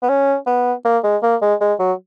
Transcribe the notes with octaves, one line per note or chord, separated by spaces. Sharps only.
B3
C#4
B3
A#3
G#3
A#3
G#3
G#3
F#3